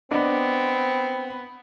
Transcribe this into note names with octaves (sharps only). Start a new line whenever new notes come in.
B3 C4 D4 D#5